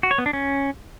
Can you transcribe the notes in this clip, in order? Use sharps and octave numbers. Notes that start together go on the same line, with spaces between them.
F#4
C#5
B3
D4
C#4